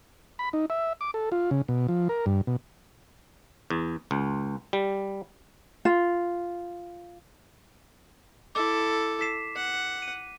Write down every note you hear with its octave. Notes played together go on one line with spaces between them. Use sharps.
B5
D#4
E5
D6
A4
F4
C#3
B2
F3
A#4
G2
B2
E2
C#2
G3
F4
E4 A4 D6
B6 C7 E7
F#5
D#7